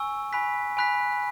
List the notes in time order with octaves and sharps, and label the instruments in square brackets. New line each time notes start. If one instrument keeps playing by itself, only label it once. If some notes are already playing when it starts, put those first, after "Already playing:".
Already playing: [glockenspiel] G#5 C#6 E6
G#5 B5 F#6 B6
G#5 B5 F#6 B6